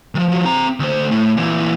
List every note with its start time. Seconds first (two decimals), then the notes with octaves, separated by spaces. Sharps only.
0.15 D#3 F3
0.28 F3 F#4
0.45 C4 A#5
0.80 D2 C5
1.11 A2
1.37 A#2 E3